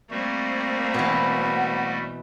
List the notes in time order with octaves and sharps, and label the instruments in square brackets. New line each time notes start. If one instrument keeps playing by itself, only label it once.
[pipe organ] G3 A3 F#4 [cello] A#3 C4
[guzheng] B2 E3 [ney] F#5